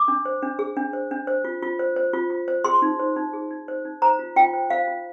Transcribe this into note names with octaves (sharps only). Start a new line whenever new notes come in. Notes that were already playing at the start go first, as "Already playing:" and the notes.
Already playing: D6
D4
C5
D4
G#4
D4
C5
D4
C5
F4
F4
C5
C5
F4
F4
C5
G#4 C6
D#4
C5
D#4
G#4
D#4
C5
D#4
C5 A#5
F4
F4 G5
C5
C5 F5
F4